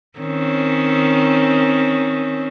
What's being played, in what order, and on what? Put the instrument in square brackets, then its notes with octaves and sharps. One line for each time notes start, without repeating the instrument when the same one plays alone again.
[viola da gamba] D#3 C4 C#4